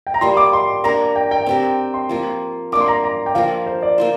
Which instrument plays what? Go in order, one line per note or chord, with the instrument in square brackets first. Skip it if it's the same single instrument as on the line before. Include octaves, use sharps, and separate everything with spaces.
[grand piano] G5
A#5
[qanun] G3 A#3 F4 [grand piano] C6
[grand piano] D6
C6
[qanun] A#3 D4 A#4 [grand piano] A#5
[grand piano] G5
G5
[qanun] C4 G4 A#4
[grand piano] C6
[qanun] F3 A#3 F4
[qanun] A#3 D4 A#4 [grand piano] D6
[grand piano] C6
A#5
A#5
G5
[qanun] F3 A#3 F4 A#4 [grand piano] F5
[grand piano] C5
D5
[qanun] A#3 F4 C5